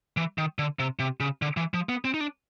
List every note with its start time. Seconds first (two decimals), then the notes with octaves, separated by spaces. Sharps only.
0.17 E3
0.38 D#3
0.59 D3
0.79 C3
0.99 C3
1.20 C#3
1.42 D3
1.57 E3
1.74 F3
1.89 B3
2.05 C4
2.14 D#4
2.20 D4